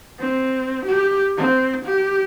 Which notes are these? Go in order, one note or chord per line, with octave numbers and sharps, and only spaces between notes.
C4
G4
C4
G4